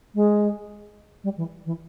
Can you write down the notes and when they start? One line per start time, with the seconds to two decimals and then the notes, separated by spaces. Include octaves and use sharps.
0.15 G#3
1.24 G3
1.37 E3
1.66 E3